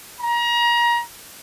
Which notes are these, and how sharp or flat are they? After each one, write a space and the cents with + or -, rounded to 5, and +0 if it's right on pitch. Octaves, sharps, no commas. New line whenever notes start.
A#5 +30